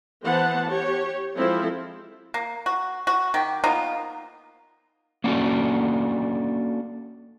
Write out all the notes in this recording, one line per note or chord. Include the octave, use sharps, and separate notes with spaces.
E3 B3 C5 F#5 A5
G4 C#5
F3 G#3 C4 E4 A4
A#3
F#4
F#4
D#3 G4
A#3 B3 D#4 F4
A#3 C#4 D4 F4 F#4 A4